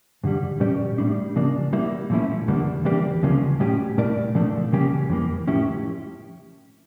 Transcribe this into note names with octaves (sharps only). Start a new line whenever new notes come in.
G2 D3 G3
A#2 G3 C#4 G4 D5
A2 G3 D4
C#3 F3 A#3 D4
G3 A#3 E4
A#2 F3 A3 C#4 E4
E2 D3 G3 A#3 D4
E3 G3 A#3 D4 G4
D2 C#3 F3 A#3 C#4
A2 G3 C#4 G4
A#2 A3 E4 A#4 D5
A#2 F3 A3 D4 A4
C#3 G3 A#3 C#4 G4
F2 E3 A#3
A2 F3 C#4 E4 G4